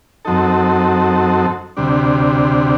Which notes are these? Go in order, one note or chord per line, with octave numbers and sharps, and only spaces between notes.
F#2 F#3 C4 D#4 A4
D2 C3 G3 D4